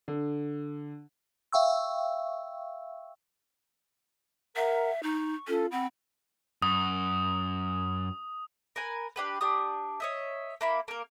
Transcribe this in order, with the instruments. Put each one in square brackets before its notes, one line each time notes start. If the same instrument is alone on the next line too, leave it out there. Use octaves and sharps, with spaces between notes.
[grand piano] D3
[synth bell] E5 F5 G5 C#6 E6
[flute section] A#4 F#5 A#5 [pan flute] E5
[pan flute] D#4 [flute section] C#6
[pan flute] C#4 [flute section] F4 A4
[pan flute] C4 [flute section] F#5 B5
[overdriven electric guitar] F#2 [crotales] D#6
[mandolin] A#4 B4 G#5
D4 G4 B4
D4 G4 D#6
C#5 D#5 E5
A#3 E4 B5
A#3 A#4